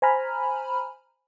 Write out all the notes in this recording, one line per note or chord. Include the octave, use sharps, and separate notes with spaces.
C5 G#5 A#5 B5 F6